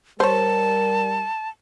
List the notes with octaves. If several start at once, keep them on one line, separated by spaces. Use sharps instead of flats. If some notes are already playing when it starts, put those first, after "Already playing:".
G3 A#4 C5 C#5 A5